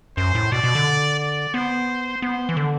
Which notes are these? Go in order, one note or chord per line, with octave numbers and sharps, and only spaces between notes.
F#2 C5
A2
B2 D5
B2
D3
D5
B3 C5
B3 C5
E3
D3